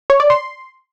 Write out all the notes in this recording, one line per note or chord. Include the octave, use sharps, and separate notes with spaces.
C#5
D5
C6